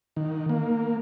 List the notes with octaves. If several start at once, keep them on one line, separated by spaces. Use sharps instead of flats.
D#3
A#3